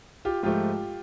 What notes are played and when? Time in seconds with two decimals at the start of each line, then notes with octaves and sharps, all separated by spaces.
0.25 F4 G4
0.43 G#2 F3 A3 F4 G4